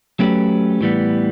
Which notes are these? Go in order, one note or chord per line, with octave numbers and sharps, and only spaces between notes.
F#3 A3 C#4 G4 B4
A2 E3 G3 B3